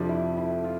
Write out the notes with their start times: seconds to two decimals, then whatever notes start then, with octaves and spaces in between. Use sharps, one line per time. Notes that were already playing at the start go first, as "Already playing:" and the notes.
Already playing: F2 C3 F3 D4
0.09 E4
0.37 E4
0.64 F4